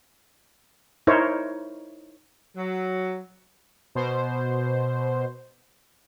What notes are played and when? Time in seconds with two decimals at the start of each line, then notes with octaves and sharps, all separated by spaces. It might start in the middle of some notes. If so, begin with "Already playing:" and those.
1.07 D#4 E4 A#4 C5 C#5
2.56 F#3
3.95 B2 C5